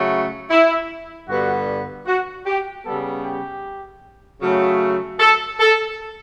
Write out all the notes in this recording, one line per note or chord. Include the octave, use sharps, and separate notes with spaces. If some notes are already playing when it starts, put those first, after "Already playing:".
Already playing: C#3 F#3 A3
E4
G2 D3 G3 B3 F#4
F#4
G4
C#3 G3 B3 A4
G4
C#3 F#3 A3
A4
A4